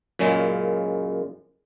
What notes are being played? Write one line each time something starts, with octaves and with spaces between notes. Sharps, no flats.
F#2 A#2 C#3 G#3